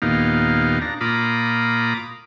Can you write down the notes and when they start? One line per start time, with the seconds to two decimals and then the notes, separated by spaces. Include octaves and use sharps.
0.02 D#2 A#2 B3 D#4 G4 F5
0.81 D4 A#5
1.01 A#2 F4 A#5 B5 D6 D#6